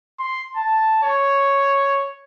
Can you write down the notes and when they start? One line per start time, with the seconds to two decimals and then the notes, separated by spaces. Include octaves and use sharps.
0.19 C6
0.56 A5
1.03 C#5